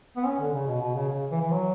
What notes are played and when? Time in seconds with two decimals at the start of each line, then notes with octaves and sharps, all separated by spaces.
0.16 B3
0.25 C#4
0.39 D3
0.53 C#3
0.67 B2
0.81 B2
0.95 C#3
1.09 C#3
1.31 E3
1.41 E3
1.52 F#3